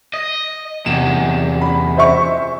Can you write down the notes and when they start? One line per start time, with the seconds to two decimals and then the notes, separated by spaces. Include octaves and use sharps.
0.14 D#5
0.86 E2 C3 E7
1.61 B5
1.97 C5 E5 C#6